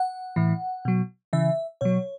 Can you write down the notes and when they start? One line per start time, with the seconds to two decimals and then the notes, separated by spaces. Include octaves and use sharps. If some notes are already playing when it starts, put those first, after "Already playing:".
Already playing: F#5
0.36 A2 E3
0.85 B2 F#3
1.33 C#3 E3 E5
1.81 B2 F#3 C#5